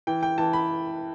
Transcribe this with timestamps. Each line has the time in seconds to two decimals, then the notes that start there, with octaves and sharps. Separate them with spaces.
0.07 E3 G5
0.23 G5
0.38 E3 A5
0.53 B5